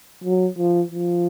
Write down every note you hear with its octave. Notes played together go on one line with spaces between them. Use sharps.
F#3
F3
F3